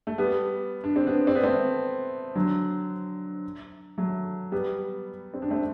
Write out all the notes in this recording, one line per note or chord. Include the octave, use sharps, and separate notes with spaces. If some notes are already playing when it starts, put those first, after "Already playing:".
A3
G3 B3
D4
C4
B3 D4
C4
B3
A3 C4
D3 F#3
F#3 A3
G3 B3
C4
D4
A3 C4